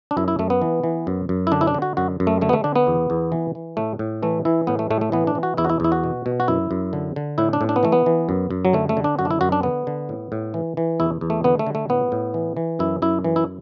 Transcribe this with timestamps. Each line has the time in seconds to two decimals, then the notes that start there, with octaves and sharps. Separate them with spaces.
0.11 D4
0.17 F#2 E4
0.28 E4
0.39 F#2 A3
0.50 B3
0.62 E3
0.84 E3
1.07 F#2
1.29 F#2
1.47 E4
1.52 D3 D4
1.61 E4
1.67 D4
1.74 D3
1.82 F#4
1.97 F#2 F#4
2.20 F#2
2.27 A3
2.41 D3 A3
2.49 B3
2.53 A3
2.64 D3 D4
2.76 B3
2.87 E2
3.10 E2
3.32 E3
3.55 E3
3.77 A2 A3
3.99 A2
4.23 E3 A3
4.45 E3 E4
4.67 A2 B3
4.79 A3
4.90 A2 A3
5.01 A3
5.12 E3 B3
5.27 D4
5.35 E3
5.43 F#4
5.57 E2 E4
5.65 F#4
5.70 E4
5.80 E2 E4
5.92 F#4
6.04 B2
6.26 B2
6.40 F#4
6.48 F#2 E4
6.71 F#2
6.93 D3
7.16 D3
7.38 A2 E4
7.53 D4
7.61 A2
7.69 D4
7.76 B3
7.83 E3 A3
7.92 B3
8.06 E3
8.29 F#2
8.51 F#2
8.65 F#3
8.73 D3 A3
8.89 A3
8.97 D3
9.04 D4
9.19 F#2 F#4
9.25 D4
9.31 E4
9.41 F#2 F#4
9.52 D4
9.63 D3 B3
9.87 D3
10.09 A2
10.32 A2
10.54 E3
10.77 E3
11.00 E2 E4
11.21 E2
11.30 A3
11.44 D3 B3
11.59 A3
11.66 D3
11.75 A3
11.89 A2 B3
12.12 A2
12.34 E3
12.57 E3
12.79 F#2 E4
13.02 F#2 E4
13.24 E3
13.36 E4